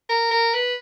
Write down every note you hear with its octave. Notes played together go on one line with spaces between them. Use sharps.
A#4
A#4
B4